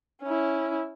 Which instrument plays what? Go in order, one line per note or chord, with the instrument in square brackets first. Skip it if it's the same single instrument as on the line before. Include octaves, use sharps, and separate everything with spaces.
[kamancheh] C#4 E4